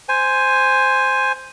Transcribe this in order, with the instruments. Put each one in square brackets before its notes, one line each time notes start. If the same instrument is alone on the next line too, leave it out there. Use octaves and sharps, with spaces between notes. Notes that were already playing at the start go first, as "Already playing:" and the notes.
[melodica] C5 G#5